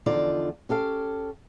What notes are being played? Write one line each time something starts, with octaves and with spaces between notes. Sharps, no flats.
E2 D3 F3 D#4 F4 D5
C#4 G4 A4 F5